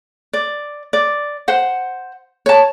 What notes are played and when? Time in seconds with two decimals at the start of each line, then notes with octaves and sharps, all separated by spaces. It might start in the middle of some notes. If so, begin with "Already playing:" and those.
0.33 D5
0.93 D5
1.48 C5 F#5
2.46 C#5 A5